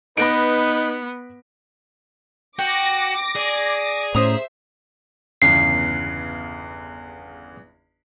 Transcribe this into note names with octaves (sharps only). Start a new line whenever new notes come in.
B3 D#4 B4 B5 A#6 D7
F#4 G5 D6 A#6
G#4 D5
A2 C#4 C5 E5 A#5 D#6
G1 E2 C#3 C7